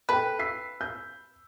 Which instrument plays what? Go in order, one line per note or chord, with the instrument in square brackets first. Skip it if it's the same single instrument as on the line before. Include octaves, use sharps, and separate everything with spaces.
[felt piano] A4 G5 [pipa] B4
[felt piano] E6 B6 C7
G6